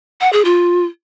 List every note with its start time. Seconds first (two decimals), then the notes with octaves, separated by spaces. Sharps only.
0.21 F#5
0.33 G#4
0.45 F4